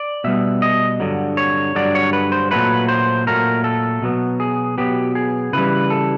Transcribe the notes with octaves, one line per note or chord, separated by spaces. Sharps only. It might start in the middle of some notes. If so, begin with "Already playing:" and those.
Already playing: D5
B2 G3 B3 E5
D#5
G2 D3 F#3
C#5
G2 D3 F#3 D5
C#5
B4
C5
A#2 F#3 A3 B4
C5
A#2 F#3 A3 A#4
A4
B2 F#3 B3
G#4
B2 F#3 B3 G4
G#4
C#3 E3 G3 B4
A4